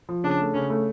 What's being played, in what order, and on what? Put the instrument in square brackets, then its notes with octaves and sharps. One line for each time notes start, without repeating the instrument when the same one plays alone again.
[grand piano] F3
[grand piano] C#3 [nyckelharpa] D4
[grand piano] A3
[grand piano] C#3 [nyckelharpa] C#4
[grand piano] A3